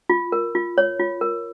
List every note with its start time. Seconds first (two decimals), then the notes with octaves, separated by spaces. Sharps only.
0.09 F4
0.32 A#4
0.55 F4
0.78 C#5
1.00 F4
1.21 A#4